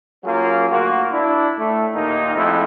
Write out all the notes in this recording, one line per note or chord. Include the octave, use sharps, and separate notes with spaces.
F#3 A#3 C#4 F4 G#4
D2 A#3 F4 F#4
D4 E4
A2 A3
D#2 A#2 A#3 D#4
F2 G#2 F3 A3 E4